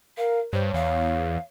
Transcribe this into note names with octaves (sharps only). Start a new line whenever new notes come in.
A#4 F5
G2 C5 C#5
E2 F5